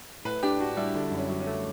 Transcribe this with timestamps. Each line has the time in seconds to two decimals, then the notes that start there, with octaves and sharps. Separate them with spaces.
0.25 A2 B4
0.43 D4 G4
0.60 D4 F#4
0.77 G3 E4
0.95 D3 D4
1.11 F#2
1.18 C#4
1.29 F#3
1.40 C#4
1.47 A3